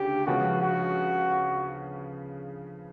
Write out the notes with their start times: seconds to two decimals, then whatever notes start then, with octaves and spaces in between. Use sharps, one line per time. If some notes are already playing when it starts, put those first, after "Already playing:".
Already playing: D2 C#3 G4
0.26 C#3 F3 G#3 B3 F#4
0.61 F#4